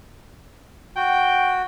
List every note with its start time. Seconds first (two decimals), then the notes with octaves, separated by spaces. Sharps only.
0.96 F#4 G5